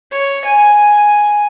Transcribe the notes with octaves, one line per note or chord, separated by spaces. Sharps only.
C#5
G#5